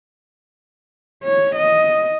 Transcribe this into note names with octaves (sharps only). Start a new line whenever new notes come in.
C#5
D#5